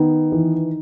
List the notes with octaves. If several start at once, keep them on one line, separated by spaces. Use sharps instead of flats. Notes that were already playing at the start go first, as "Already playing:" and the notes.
Already playing: D#3 B3
E3